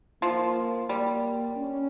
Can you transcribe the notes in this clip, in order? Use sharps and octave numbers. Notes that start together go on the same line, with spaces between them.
F3 A#3
G3 A#3
C#4